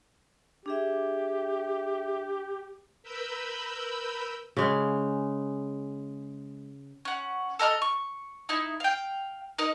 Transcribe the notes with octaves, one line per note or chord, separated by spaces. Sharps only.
D4 G4 G#4 E5
A#4 B4 B5 E6 G6
C#3 G#3 F5
C#4 F#5
A4 D#5 A#5 F6
C#6
D#4 E4
F5 G5
D#4 A#4 D#5